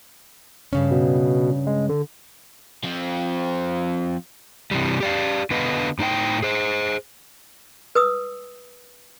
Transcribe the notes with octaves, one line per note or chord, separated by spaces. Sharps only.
G2 C#3 C#4
B2
G#3
D3
F3 C4
C3 E3 G3
G4 D5 F5
D3 B3 B4 D#5 F5
A2 D#4 C5 G5
G#4 C5
B4 D#6 E6